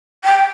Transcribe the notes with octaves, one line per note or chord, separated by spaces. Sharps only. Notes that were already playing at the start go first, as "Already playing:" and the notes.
G5